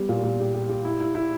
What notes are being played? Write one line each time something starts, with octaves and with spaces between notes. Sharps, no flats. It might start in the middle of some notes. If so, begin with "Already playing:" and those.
Already playing: G3 B3 G4
A#2
A#2
G4
G4
G4
E4
E4
E4